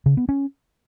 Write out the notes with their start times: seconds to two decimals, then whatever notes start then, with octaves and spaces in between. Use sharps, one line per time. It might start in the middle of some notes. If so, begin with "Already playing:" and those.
0.06 C#3
0.17 B3
0.29 C#4